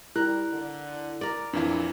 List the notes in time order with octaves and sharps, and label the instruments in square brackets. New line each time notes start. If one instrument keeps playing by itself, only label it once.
[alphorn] G3 [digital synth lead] E4 [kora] A#4 [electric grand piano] F#6
[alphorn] D3
[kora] A#4 D5
[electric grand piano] F2 E3 E4 [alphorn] A#2 [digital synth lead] D4